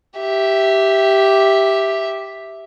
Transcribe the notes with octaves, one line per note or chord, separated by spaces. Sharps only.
G4 E5